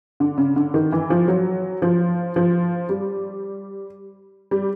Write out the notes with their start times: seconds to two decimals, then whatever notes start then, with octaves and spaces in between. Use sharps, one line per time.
0.20 D3
0.38 C#3
0.56 D3
0.74 D#3
0.92 E3
1.10 F3
1.28 F#3
1.82 F3
2.36 F3
2.89 G3
4.51 G3